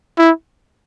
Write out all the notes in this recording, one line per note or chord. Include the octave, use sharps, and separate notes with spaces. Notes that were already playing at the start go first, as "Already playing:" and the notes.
E4